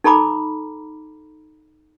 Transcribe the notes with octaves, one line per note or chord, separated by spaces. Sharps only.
D#4 A4 A#5 B5 D6